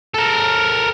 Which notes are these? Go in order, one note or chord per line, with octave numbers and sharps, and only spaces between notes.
A4 A#4